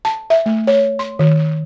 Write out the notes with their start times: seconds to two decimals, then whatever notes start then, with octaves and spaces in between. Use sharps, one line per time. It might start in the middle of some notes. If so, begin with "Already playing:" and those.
0.05 A5
0.30 E5
0.46 A3
0.67 C#5
0.99 C6
1.19 D#3